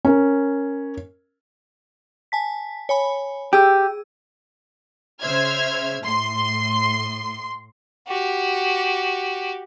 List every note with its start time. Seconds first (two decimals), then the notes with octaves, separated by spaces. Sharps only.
0.05 C#4 A#4
2.32 G#5 A5 B6
2.89 C#5 G#5 B5
3.53 G4 G#4 E6
5.20 C#3 C5 E5 F6 G#6
6.02 A2 C6
8.08 F#4 G4